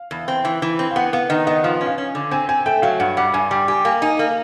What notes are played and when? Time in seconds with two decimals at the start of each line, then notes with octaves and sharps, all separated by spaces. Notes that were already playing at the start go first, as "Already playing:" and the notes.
Already playing: F5
0.11 E2
0.28 C4
0.45 E3
0.62 E3
0.79 C4
0.91 F5
0.96 B3 F#5
1.13 B3 F5
1.29 D#3 D#5
1.47 B3 D#5
1.64 F3 F5
1.81 C#4
1.86 F5
1.98 C#4
2.15 D3
2.31 C4 G#5
2.49 C4 G#5
2.66 A3 G5
2.82 F#3 F5
2.99 G2 F#5
3.17 G3 F#5
3.34 G2 G#5
3.51 G3 G5
3.68 G4 G#5
3.85 A#3 G#5
4.02 D#4 G#5
4.19 A#3